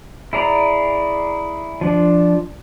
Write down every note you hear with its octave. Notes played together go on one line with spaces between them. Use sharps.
E4 G#4 D5 A#5
F3 D4